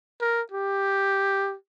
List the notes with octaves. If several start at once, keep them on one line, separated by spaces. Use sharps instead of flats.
A#4
G4